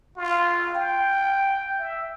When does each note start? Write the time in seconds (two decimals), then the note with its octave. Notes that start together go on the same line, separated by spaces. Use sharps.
0.17 F4
0.75 G5
1.79 E5